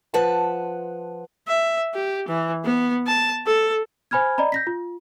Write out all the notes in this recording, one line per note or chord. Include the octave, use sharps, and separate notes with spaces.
F3 B4 F#5 A5
E5
G4
E3
B3
A5
A4
C5 G#5 B5 F6 G#6
D5 D#5 A#5 B5
G6 A#6 B6
F4